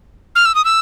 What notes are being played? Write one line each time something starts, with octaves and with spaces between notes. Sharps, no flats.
F6
E6
D#6
E6